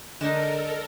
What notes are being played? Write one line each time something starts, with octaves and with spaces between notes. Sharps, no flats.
D3 G#3 D4 D#4 A4 A#4 D#5 E7